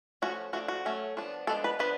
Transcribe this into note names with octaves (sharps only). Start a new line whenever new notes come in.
F3 A3 C#4 F#4
F3 A3 D4 F#4
F#4
F#3 A3 C#4
F3 B3 D4
F3 G#3 B3 D4 A4
B4
F3 B3 D4 B4